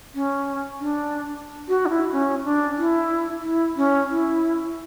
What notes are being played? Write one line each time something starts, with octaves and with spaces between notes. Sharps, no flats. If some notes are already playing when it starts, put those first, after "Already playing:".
C#4
D4
F#4
D4
E4
C#4
D4
E4
E4
C#4
E4